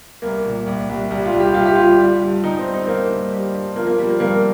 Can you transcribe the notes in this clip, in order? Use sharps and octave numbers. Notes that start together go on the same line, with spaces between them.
C2 A#3
A#2
C2
C2
C2 G3
F4
C2
G4
C2 F4
G4
G3 F4
G3
G2
G2 D#4
C4
G2
D#4
C4
G2 A#3
G2
G3
G2
F3 A#3
A#3
F3 G3
A#3
G2 A#3